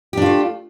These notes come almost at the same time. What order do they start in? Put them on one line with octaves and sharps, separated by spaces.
G4 D4 F4 A3